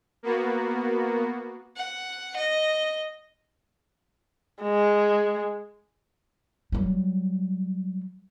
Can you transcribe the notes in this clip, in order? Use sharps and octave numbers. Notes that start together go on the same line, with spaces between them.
A#3 B3 F#4
F#5
D#5
G#3
F#3 G3